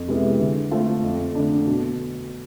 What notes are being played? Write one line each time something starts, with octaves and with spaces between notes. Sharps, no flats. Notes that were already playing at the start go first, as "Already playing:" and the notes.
Already playing: F2
C3 G#3 B3 E4
D3
A3 C4 F4 A4
F2
D3 A3 D4
B2